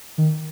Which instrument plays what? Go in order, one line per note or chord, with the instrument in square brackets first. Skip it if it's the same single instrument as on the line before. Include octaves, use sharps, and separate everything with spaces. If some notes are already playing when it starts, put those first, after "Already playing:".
[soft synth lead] D#3